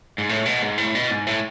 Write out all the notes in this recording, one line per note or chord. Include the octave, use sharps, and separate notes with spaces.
G#2
A2
B2
G#2
A2
B2
G#2
A2